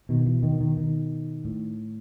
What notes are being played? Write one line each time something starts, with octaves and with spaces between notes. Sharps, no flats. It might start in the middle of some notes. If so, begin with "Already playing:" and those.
B2 D#3
E3
D#3
D#3
D#3
A2